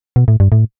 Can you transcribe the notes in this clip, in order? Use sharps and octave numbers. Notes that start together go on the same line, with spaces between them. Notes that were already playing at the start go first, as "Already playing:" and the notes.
B2
A2
G2
A2